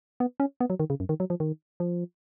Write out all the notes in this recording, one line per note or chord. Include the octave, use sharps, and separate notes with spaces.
B3
C#4
B3
F#3
D#3
C#3
F#2
D#3
F#3
F3
D#3
F3